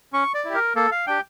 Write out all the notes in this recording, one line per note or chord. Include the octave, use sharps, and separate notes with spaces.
C#4 C#6
D5
E4 G4
A#4
A#3 A4
F5
D4 G4 G5